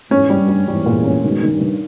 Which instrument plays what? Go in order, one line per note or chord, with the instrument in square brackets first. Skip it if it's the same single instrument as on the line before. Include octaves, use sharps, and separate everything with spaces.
[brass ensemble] E2 G#2 [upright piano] C#4
[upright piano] G3
[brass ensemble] G2
[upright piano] G3
[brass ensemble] E2 G#2 [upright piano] G3
[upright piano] A#2
C#4
[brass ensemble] G#2 B2 [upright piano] D#3
[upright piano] D#3
[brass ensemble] G2
[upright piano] D#3